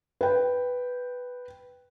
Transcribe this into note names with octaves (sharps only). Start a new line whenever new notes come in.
B4 G5